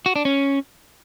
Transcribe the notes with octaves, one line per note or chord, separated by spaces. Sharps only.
F#4
D4
C#4